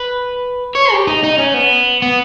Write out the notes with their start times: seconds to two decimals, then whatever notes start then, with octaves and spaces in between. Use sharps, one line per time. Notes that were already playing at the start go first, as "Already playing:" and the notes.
Already playing: B4
0.75 C#5
0.92 G4
1.07 D#4
1.24 D#4
1.38 C#4
1.54 B3
2.02 B3